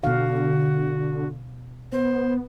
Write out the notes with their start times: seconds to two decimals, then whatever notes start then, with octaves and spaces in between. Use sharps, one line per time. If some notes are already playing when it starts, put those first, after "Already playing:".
0.04 B2 D3 F#4 F5
1.92 B3 C5